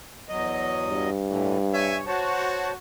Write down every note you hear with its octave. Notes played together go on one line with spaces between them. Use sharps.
E2 F#3 D#5
G2
A2 D3 E3
C#5 E5 G#5
F#4 C5 C#5 A5